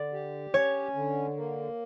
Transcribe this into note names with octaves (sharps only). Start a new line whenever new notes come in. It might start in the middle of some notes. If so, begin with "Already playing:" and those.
Already playing: D3 D5
G4
C#4 C#5
D3
A#3